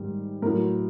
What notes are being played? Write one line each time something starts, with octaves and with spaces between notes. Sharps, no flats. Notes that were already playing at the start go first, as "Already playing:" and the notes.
Already playing: G#2 D#3 G3
A2 F#3 A#4